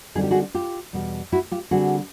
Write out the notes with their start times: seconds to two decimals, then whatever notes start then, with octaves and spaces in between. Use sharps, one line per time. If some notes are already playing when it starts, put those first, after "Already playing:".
0.15 D3 G3 C4 D#4 G#4
0.23 G4
0.31 F#4 G#4
0.54 F4 G4
0.93 E2 B2 G3
1.32 E4 F#4
1.51 F4 G4
1.71 D3 G3 C4 F#4 G#4